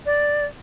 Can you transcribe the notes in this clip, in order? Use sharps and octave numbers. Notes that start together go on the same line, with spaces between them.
D5